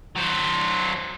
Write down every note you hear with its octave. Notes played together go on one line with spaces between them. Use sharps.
F#3 C5